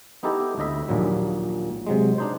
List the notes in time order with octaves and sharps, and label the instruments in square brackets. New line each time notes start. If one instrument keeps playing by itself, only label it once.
[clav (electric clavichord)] B3 D#4 E4 G4 A4 D#5
D2 E4 D#5 E5
A#1 D#2 A#2 F#3
C3 F#3 G#3
D4 D#4 C5